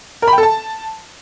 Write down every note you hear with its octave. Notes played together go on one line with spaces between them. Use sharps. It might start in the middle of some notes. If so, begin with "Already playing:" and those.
A#4
B5
G5
A4
A5